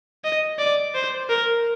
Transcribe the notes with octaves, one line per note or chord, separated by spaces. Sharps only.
D#5
D5
C5
A#4